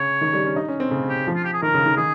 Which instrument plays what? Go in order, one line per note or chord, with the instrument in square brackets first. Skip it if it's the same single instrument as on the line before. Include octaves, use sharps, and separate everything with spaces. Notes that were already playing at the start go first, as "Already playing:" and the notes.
Already playing: [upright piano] C#3 [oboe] C#5
[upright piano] D#3
G3
C#4
D#4
C#4
C4
C#3
[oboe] G4
[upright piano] F3
[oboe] F4
G4
G#4
[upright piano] D#3 [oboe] A#4
[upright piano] C#3
D#3
[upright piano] D#3 [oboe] G#4